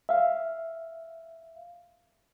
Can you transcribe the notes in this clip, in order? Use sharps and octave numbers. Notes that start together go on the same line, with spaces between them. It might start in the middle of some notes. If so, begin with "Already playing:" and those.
E5 F5